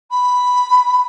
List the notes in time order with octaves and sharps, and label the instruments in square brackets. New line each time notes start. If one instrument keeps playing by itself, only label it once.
[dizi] B5